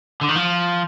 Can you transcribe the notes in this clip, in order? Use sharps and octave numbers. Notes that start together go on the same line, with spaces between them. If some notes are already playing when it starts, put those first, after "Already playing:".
D3
D#3
F3